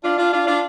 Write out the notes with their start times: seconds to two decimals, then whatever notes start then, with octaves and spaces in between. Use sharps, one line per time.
0.03 D4 F4
0.17 D4 F4
0.32 D4 F4
0.47 D4 F4